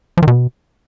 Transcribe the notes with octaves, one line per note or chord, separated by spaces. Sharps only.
F3
D#3
B2